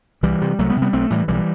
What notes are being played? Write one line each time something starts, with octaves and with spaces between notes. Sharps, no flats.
C2 E3 G3
C3
C2 F#3 A3
G3 B3
C3
G3 B3
B1 A3 C4
A2 E3 G3
B1 E3 G3